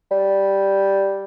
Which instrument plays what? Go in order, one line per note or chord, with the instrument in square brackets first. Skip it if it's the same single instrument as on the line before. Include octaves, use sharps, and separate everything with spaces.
[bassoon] G3